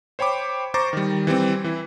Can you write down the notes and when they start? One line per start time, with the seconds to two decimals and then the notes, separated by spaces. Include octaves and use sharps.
0.19 C5 C#5 G5 B5 D6
0.74 C5 A#5 C#6 D6 A6 A#6
0.93 D#3 G3
1.27 E3 G3 C4
1.64 E3 E4